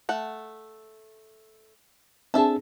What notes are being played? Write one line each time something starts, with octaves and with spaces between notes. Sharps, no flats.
A3 F#5
C4 D4 G#4 A4 E5 A5